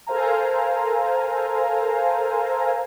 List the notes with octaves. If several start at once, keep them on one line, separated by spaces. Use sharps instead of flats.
A4 A#4 C5 F5 G#5 A#5